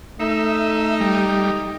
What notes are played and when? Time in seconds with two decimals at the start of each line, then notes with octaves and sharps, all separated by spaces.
0.20 A3 D#4 E5
1.00 G3